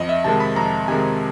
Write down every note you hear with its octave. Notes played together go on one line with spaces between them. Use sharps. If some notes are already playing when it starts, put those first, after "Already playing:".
Already playing: F2 D#5
E5
C3 D#3 G#3 A5
B5
F2 A#5
C3 D#3 G#3 G#5